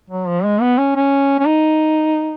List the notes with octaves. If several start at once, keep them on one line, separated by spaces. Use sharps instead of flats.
F#3
F3
G#3
B3
C#4
C#4
C#4
D#4